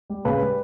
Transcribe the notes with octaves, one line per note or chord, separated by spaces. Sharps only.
G3
C#3 B4
G3